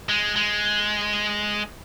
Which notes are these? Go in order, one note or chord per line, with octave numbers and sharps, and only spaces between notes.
G#3
G#3